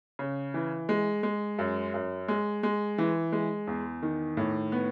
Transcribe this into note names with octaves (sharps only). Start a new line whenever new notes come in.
C#3
E3
G#3
G#3
F#2
F#2
G#3
G#3
E3
G#3
E2
D#3
A2
B3